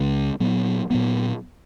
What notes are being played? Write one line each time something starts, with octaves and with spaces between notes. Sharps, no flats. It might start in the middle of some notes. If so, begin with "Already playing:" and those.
Already playing: C#2 C#3 G#3
A#2 F#3 B3
A#2 F#3 B3